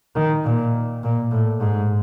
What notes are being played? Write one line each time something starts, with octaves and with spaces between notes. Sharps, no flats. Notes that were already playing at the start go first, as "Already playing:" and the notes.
D#3
A#2
A#2
A2
G#2